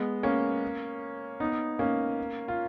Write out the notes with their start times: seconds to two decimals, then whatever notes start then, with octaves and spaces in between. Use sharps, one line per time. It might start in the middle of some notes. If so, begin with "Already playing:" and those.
Already playing: G#3 B3
0.23 A#3 C#4
1.40 B3 D#4
1.79 A#3 C#4
2.48 F4